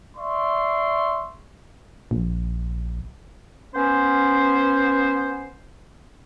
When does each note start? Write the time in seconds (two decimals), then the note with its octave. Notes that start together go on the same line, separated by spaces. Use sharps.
0.17 D5 E5 C6 C#6
2.11 A#1
3.74 B3 C#4 C5